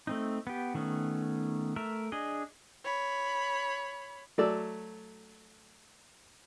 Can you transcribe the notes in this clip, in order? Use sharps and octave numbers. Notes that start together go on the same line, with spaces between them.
A3 C4 D#4
B3 G4
D#3 A3 B3 C#4
A3 A#4 E5
D4 G#4 D#5
C#5 B5
F#3 A3 D5 E6